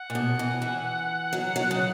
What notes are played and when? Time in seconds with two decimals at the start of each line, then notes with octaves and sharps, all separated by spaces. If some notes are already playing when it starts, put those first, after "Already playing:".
Already playing: F#5
0.10 A#2
0.15 B2
0.39 E3
0.62 E3
1.33 F#3
1.56 F#3
1.71 C#3